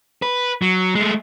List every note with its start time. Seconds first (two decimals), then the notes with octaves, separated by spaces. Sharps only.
0.22 B4
0.62 F#3
0.95 G#3 A3